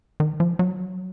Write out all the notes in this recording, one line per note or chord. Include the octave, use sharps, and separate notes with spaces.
D#3
F3
F#3